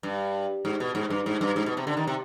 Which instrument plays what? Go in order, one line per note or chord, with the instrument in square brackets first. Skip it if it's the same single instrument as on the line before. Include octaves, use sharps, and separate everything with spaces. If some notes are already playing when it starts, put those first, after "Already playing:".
[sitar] G2
G#2
B2
G#2
G2
G#2
G2
G#2
B2
C3
D3
D#3
C3